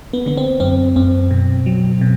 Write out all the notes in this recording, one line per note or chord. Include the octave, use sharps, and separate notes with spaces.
B3
D3 B3
C4
F#2 C4
F#2 C4
B2
F#3
B2